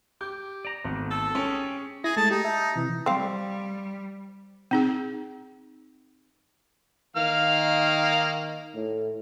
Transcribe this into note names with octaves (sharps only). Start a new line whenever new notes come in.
G4 G6
D5 A#5
G#1 D#3 A3 B3
A4
C#4 G4 G#4
E4 G#4 A#6
G#3 A3 A5
D#4 G4
E5 A5
C3 E3
G3 C4 F5
C4 D#4 G#4
D#3 A#3 F5 F6
A2